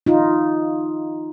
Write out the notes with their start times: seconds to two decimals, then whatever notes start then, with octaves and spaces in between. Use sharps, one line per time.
0.06 D#4 F4